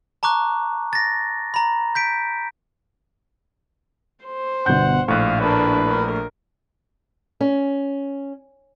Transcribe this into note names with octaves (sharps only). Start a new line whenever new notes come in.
A5 A#5 C#6 D6 F#6
A6 A#6
A#5 B5
G6 B6 D7
C5
G1 B2 F#5 G6
A#1 A2 F5 C#6 F#6
D4 A#4 B4
A#4
C#4